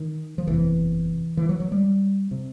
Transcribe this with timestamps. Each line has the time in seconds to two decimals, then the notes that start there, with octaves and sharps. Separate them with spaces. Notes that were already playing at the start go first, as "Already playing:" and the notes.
Already playing: D#3
0.38 F3
0.47 F#1 E2 C3 E3
1.37 E3
1.49 F#3
1.60 F#3
1.72 G3
2.31 C3